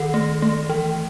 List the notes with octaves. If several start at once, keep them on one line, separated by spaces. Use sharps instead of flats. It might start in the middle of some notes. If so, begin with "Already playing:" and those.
Already playing: D#3 A4
A3
A3
E3